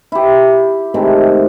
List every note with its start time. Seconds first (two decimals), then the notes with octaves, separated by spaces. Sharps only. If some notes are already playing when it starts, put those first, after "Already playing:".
0.12 E4 G4
0.94 C3 D#3 G#3 A3